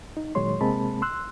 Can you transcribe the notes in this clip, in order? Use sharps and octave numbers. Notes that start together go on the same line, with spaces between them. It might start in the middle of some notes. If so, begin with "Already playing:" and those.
D#4
A#2 D#3 F#3 G#3 C#5 C6
C3 G#3 A#3 C4 A5 B5
C6 E6 F#6